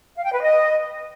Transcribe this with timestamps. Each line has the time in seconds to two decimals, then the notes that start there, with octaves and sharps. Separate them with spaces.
0.16 F5
0.24 G5
0.33 B4
0.41 D#5